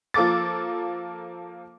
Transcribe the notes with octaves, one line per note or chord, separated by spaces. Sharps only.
F3 A#3 A4 D6 A6